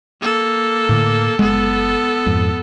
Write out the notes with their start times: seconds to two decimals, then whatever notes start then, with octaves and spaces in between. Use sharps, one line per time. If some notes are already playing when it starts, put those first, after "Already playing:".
0.22 A#3 A4
0.89 A2 D3
1.39 F#1 G#3 B3 A4
2.26 F2 G#2